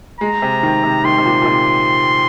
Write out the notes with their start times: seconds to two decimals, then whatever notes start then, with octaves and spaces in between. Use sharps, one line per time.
0.20 G#3 A#5
0.42 C3
0.63 D#3
0.84 C3
1.05 D#3 C6
1.18 C3
1.25 A#2
1.42 A#2
1.46 C3